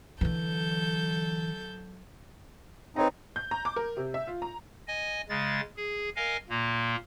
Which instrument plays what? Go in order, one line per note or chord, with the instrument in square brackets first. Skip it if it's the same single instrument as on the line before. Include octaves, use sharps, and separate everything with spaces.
[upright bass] D3 E3 [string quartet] F#3 A4 G6
[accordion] C4 D#4 [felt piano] B4 C#5 A#5
[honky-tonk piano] G6
A#5
D6
A#4
C3
E5
F4
A#5
[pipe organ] D#5 G#5
C#3 G#3 A6
G#4
A#4 D#5 F5 G#5
A#2 A#3